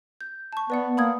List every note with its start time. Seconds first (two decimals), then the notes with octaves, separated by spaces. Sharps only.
0.21 G6
0.53 A5 C#6
0.70 B3 B4 D5 F#5
0.97 A#3 B5 D#6 G#6